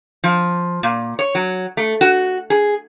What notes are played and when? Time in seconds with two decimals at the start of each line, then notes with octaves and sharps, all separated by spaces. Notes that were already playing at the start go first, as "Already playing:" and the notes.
0.24 F3
0.83 A#2
1.19 C#5
1.35 F#3
1.77 A3
2.01 F#4
2.50 G#4